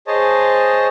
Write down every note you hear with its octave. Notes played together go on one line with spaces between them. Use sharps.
G#4 C5 C#5 D#5 A5